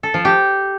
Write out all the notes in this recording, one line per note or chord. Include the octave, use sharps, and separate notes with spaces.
A4
F3
G4